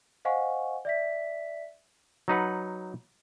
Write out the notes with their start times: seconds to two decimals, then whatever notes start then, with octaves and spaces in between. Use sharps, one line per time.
0.25 C5 D#5 F5 F#5 G#5 C#6
0.85 D5 E5 B6
2.28 F#3 D#4 B4 F#5